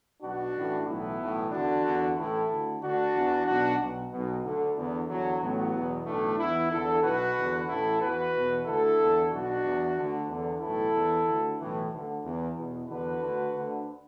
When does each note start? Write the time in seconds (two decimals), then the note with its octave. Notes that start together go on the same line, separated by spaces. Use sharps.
0.22 B1 B2 D4 F#4
0.56 A1 A2 E3
0.87 B1 A2 E3 B3 E4
1.20 B1 A2 E3
1.52 E2 D3 D4 F#4
1.85 E2 D3
2.17 A1 A2 E3 E4 A4
2.50 D2 D3
2.82 D2 D3 D4 F#4
3.15 E2 E3
3.47 B1 B2 D4 F#4
3.80 B1 B2
4.12 B1 B2
4.44 D2 D3
4.77 E2 D3
5.09 E2 D3 F#3
5.41 A1 A2 E3 F#3 B3
5.74 E2 B2
6.06 B1 A2 E3 A3 D4
6.39 E2 E3 B3 E4
6.72 E2 D3 E4 A4
7.04 B1 B2 F#4 B4
7.37 E2 D3
7.69 A1 A2 E3 E4 A4
8.01 E2 E3 F#4 B4
8.34 E2 B2
8.66 D2 D3 E4 A4
8.99 E2 D3
9.31 B1 B2 D4 F#4
9.64 E2 E3
9.97 D2 D3
10.28 E2 D3
10.61 B1 A2 E3 E4 A4
10.94 E2 E3
11.26 D2 D3
11.59 B1 A2 E3
11.91 D2 D3
12.23 E2 E3
12.56 E2 B2
12.88 E2 D3 F#4 B4
13.21 D2 D3
13.53 D2 D3